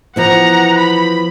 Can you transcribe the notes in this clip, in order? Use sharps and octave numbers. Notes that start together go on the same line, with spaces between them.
E3 F3 B3 F#5 A#5
B5